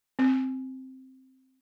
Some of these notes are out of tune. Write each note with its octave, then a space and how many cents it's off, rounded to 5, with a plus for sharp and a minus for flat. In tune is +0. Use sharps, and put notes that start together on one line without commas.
C4 +0